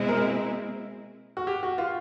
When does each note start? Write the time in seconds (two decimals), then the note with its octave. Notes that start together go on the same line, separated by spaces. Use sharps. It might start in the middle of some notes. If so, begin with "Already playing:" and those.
Already playing: B2 G#3 C4 E4
0.08 A#4
1.37 F#4
1.47 G4
1.63 F#4
1.78 F4